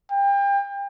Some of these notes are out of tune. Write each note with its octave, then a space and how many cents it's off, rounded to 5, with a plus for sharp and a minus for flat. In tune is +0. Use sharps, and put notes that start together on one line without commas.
G5 +35